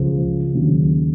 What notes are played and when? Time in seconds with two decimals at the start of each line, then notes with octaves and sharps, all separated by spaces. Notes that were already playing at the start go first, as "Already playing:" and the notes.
Already playing: C#2 C#3 F3
0.54 D#2 C#3 F#3